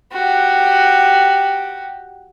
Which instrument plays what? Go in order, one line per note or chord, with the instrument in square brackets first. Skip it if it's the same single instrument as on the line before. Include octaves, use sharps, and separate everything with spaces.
[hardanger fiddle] F#4 G4